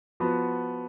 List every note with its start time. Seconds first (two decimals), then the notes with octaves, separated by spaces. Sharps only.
0.20 F3 B3 F#4